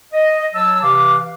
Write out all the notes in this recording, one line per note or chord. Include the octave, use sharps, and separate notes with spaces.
D#5
F#3 A5 E6
C3 E3 F5 D6